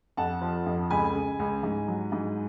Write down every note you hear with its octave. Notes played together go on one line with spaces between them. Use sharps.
F2 F#5 A5
F3
F2
C#2 G#5 B5
C#3
C#2
G#2
F#3
G#2